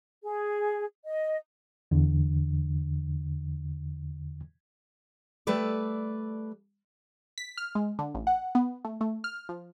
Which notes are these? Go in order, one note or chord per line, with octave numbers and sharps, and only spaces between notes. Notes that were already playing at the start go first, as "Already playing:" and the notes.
G#4
D#5
E2 D3
G3 A3 A4 B4 D5
B6
F6
G#3
D3
A1
F#5
B3
A3
A3
F6
F3